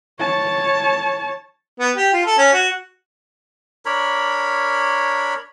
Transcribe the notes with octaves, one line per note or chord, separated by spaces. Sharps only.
C#5 A5
B3
G4
F4
A4
C#4
F#4
D4 A#4 C#5 B5